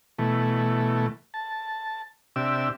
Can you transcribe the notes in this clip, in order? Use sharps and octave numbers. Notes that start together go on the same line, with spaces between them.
B2 E3 A3
A5
C3 D4 G4 E5 E6